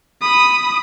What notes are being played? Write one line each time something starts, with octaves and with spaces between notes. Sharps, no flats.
B5 D#6